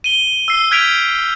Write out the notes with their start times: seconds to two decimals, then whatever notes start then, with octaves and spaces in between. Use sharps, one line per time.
0.04 D#7 G7
0.48 E6 C7
0.71 F6 G6 G#6 B6 D7 F7